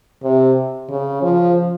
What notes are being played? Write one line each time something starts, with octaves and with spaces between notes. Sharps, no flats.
C3
C#3
F3